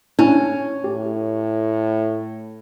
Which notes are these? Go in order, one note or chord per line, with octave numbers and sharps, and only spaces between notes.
C#4 D4 E4 G#5
A2 G4